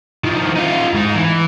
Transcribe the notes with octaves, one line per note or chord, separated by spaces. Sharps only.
D#3 F3
D#4 F4
G#2 D#4
E3